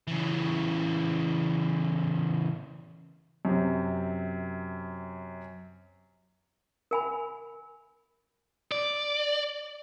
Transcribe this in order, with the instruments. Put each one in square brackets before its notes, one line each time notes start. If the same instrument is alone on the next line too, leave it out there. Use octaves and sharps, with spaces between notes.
[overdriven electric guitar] C#3 E3
[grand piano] F#2 C3
[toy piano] A#4 G#5 B5
[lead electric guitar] D5